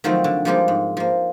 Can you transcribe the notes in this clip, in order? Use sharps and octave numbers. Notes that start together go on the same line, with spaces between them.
D#3 F3 F#3 A3 C4
D3
F3 G3 G#3 A#3 G4 G#4
G#2
F3 A#3